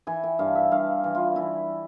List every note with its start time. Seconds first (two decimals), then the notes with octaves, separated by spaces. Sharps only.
0.07 E3 G#5
0.24 G5
0.39 G2 F5
0.55 E5
0.71 G2 F5
1.04 E3
1.15 F4
1.36 E3 E4